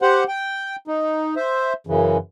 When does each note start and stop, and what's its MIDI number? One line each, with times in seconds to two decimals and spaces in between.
0.02 0.24 67
0.02 0.24 72
0.02 0.24 78
0.28 0.76 79
0.87 1.35 63
1.36 1.73 72
1.36 1.73 76
1.87 2.17 42
1.87 2.17 49
1.87 2.17 52